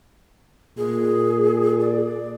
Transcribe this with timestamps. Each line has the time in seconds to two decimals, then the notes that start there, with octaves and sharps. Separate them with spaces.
0.77 A#2 G#4
1.81 D5